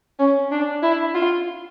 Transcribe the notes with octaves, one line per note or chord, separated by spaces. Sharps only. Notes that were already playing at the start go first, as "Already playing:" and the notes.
C#4
D4
E4
F4